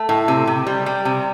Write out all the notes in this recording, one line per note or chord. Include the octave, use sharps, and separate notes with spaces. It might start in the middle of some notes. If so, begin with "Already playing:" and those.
Already playing: A3
A2
C3
C3
G3
G3
C3